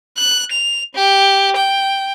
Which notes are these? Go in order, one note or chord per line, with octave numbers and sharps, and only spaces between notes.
F#6
F7
G4
G5